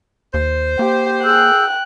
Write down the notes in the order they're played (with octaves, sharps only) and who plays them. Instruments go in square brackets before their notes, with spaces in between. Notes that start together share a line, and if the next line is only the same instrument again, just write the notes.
[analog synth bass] D#2 [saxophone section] C5
[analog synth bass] A#3 [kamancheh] G4
[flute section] G#4 E6 G6 [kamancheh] G5 F#6